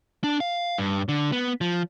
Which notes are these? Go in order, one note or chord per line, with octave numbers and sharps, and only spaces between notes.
D4
F5
G2
D3
B3
F3